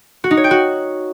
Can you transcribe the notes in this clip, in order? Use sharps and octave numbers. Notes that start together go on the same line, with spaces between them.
F#4
D#4
C#5
G5
F#4